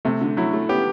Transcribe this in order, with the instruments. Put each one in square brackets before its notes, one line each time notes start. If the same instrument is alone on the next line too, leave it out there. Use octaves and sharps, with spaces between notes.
[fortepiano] C3 [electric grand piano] A3
[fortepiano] D3
[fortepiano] F#3 [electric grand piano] E4
[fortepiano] A3
[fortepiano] B3 [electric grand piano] G4